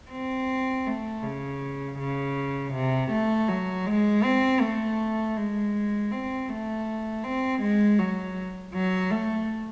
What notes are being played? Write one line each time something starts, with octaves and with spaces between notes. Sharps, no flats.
C4
A3
C#3
C#3
C3
A3
F#3
G#3
C4
A3
G#3
C4
A3
C4
G#3
F#3
F#3
A3